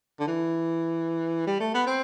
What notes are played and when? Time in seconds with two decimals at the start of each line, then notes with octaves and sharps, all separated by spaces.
0.20 D3
0.27 E3
1.47 G3
1.60 A3
1.74 B3
1.87 C4